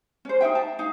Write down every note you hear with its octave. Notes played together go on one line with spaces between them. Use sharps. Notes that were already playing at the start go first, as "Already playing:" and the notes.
C#4 C5
D#4 G#4 E5 G5
A5
D#4 F5